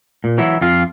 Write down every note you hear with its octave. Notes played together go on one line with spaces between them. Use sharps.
A#2
E3 F#3 E4
F2 F4 F5